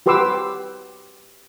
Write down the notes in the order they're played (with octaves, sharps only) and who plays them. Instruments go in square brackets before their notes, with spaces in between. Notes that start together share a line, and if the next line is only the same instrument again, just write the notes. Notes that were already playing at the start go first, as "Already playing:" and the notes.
[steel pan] F#4 G4 B4 C6 D6 E6